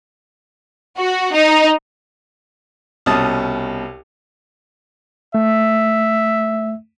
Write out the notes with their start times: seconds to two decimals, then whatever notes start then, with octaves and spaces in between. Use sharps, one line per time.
0.98 F#4
1.34 D#4
3.06 C2 B2 C#4 A5 D#6
5.35 A3 E5